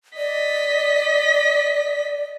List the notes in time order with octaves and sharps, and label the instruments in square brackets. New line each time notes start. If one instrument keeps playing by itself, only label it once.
[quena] D5 [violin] D#5 B6